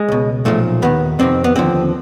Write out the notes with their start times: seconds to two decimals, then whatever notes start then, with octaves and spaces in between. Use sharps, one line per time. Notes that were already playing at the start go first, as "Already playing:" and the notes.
Already playing: G#3
0.08 C#2 B2
0.45 B1 A#2 F3 A3
0.82 D#2 D#3 B3
1.19 F2 C3 D#3 C4
1.44 B3
1.56 D#2 D3 F3 C4